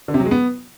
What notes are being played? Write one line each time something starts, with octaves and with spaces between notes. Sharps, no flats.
D3
C3
F#3
G#3
B3